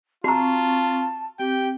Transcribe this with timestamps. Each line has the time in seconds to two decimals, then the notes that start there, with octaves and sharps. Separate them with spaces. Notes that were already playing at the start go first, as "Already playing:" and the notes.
0.24 C4 F4 F#4 A5 A#5 C#6
1.39 C4 G4 G5